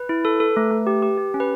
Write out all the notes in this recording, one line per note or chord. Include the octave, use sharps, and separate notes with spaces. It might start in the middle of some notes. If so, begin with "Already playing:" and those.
Already playing: B4
E4
A4
A4
A3
A3
G4
G4
G4
C#4
B4